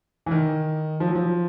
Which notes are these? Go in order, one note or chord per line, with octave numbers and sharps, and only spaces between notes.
E3
D#3
F3
F#3
F3